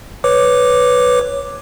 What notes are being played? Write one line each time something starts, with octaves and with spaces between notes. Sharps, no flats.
B4 C#5 D6